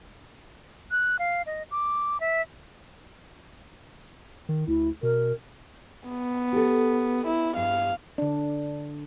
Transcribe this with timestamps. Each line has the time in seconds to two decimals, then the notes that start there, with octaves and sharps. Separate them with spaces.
0.91 F#6
1.19 F5
1.46 D#5
1.71 D6
2.20 E5
4.49 D#3
4.67 D2 E4
5.03 B2 A#4
6.08 B3
6.53 G4 A4
7.27 E4
7.56 G2 F5
8.18 D3 D4